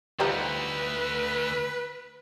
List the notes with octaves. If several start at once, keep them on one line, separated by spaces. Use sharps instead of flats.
D2 D3 F3 G3 D#4 B4